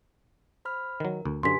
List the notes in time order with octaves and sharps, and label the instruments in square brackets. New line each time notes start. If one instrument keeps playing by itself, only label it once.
[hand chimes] C5 B5 F6
[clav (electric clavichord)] D#3 F#3 [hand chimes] A#4
[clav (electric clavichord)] D2
[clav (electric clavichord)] F#2 D3 [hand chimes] G4 B4 G#5 [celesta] C6 B6